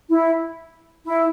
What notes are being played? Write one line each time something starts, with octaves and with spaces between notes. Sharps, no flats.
E4
E4